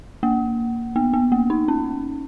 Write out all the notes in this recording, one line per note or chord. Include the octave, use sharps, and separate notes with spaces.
A#3
B3
B3
A#3
D#4
C#4